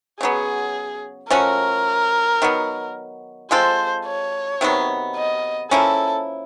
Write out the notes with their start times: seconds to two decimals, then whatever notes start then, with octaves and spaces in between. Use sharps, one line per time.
0.21 C#3 F#3 B3 G#4
1.30 F3 A3 C#4 F#4 A#4
2.42 D#3 F#3 B3
3.51 G#3 C4 F4 A4 C5
4.06 C#5
4.61 C3 D#3 F#3 B3
5.16 D#5
5.71 F3 A#3 C#4 E4 A4